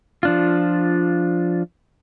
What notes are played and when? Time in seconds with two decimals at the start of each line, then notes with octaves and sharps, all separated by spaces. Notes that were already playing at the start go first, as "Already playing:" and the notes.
0.23 F3 D4 F4